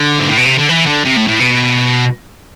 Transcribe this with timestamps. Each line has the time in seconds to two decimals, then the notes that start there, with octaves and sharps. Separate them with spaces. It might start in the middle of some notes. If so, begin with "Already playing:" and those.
Already playing: D3
0.19 G#2
0.29 A2
0.37 B2
0.45 C3
0.58 D3
0.69 E3
0.86 D3
1.04 C3
1.17 A2
1.28 A2
1.40 B2